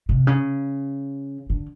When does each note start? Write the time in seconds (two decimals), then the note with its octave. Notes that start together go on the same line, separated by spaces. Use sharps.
0.09 C3
0.27 C#3
1.50 D3